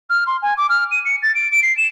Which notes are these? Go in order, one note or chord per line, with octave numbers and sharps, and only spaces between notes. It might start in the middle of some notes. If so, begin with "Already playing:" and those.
F6
C6
G#5
D6
F6
D#7
C#7
A6
D7
D7
C7
E7